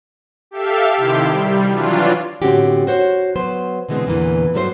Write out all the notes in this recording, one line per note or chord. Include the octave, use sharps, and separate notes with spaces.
G4 A4 E5 F5
C3 D#3 E4 G4 C6
G3
E3 F#3 D4 F4
A2 D3 C4 C#4 F#4 G4
F#4 C5 C#5
F#3 B3 C5
B2 D3 E3 G#3 B3 C4
E2 A#2 D3 E3
G2 A#2 F#3 A3 B4 C5